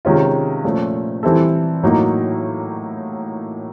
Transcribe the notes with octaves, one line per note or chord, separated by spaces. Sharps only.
C3 D#3 G#3 C#4 F4
A#2 F3 A3 C#4
E3 G3 C4 E4 A4
A2 F#3 A#3 D#4